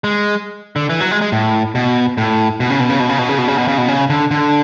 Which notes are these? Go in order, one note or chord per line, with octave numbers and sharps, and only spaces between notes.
G#3
D3
E3
F#3
G#3
G#3
A2
B2
A2
B2
C#3
B2
C#3
B2
C#3
B2
C#3
B2
C#3
B2
C#3
B2
C#3
D3
D3